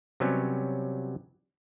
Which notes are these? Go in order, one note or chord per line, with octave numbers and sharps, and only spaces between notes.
C3 F#3 G3 B3 C#4